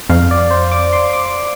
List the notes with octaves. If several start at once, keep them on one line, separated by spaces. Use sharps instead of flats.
F2 F5
D5
C5
D6
C6
D6